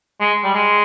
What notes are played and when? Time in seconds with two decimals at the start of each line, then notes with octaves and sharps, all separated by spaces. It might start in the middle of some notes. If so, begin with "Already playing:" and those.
0.20 G#3
0.44 G3
0.54 G#3